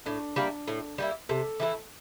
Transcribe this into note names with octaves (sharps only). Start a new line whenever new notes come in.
A2 D4
G3 A#3 E4
A2
G3 A#3 E4
C3 A4
E3 A3 E4